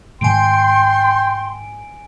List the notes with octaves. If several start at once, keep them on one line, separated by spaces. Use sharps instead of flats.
G#2 D#3 G#3 G5 G#5 C6 D7